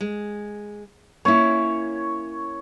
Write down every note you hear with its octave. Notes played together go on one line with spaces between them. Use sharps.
G#3
A#3 C#4 E4 C#5